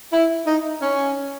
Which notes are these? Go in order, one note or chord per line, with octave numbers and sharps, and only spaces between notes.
E4
D#4
C#4